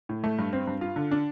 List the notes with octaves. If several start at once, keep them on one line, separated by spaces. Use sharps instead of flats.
A2
A3
G2
C4
G2
F4
D3
D4